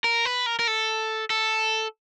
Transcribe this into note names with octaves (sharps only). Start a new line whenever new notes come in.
A#4
B4
A#4
A#4
A4
A4